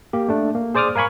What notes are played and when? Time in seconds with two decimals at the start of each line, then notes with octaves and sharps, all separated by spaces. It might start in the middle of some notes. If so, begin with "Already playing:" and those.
0.13 A#3 G4
0.28 A3 D4
0.55 A#3
0.75 G#4 C5 D5 D6 D#6 F6
0.96 A#4 F5 G#5 B5 C#6